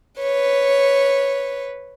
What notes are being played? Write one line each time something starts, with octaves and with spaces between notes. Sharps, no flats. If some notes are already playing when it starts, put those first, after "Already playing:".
B4 C#5